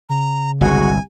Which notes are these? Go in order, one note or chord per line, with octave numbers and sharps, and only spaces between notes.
C#3 A#5
G1 C2 G#3 F#4 G#5